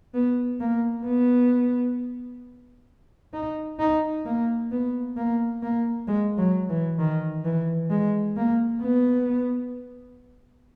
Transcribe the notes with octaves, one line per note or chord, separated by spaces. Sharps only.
B3
A#3
B3
D#4
D#4
A#3
B3
A#3
A#3
G#3
F#3
E3
D#3
E3
G#3
A#3
B3